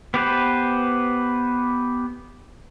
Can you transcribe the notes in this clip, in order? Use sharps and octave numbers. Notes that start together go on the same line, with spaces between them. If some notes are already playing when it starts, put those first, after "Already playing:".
B3 G4 B4 C5